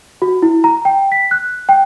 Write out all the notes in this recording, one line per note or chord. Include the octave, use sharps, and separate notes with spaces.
F#4
E4
A#5
G5
B6
F#6
G5